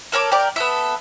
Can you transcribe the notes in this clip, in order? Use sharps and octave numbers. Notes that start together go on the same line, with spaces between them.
A4 A#4 C#5 D6
G4 A#4 D5
B3 A4 E5